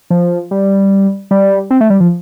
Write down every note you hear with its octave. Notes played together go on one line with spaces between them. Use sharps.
F3
G3
G3
C4
A3
G3
F3